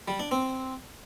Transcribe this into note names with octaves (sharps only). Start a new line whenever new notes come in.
G3
D4
C4